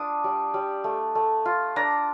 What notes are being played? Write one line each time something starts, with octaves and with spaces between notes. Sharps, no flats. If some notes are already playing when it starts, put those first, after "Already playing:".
Already playing: D4 F4 D#6
G3
G3
A3
A3
F4
D4 A#5